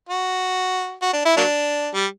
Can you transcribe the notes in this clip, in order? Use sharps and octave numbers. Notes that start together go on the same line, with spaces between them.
F#4
F#4
D4
E4
F#3 A#3 D4
G3